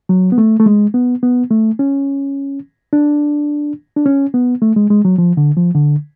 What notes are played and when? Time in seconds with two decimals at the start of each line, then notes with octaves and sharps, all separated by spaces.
0.09 F#3
0.32 B3
0.38 A3
0.59 A3
0.66 G#3
0.94 B3
1.23 B3
1.51 A3
1.79 C#4
2.93 D4
3.96 D4
4.06 C#4
4.34 B3
4.62 A3
4.76 G#3
4.90 G#3
5.05 F#3
5.18 F3
5.37 D3
5.57 F3
5.75 D3